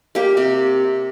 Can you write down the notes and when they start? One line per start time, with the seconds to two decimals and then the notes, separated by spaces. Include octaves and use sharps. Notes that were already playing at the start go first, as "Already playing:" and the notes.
0.15 A#3 G4
0.37 C3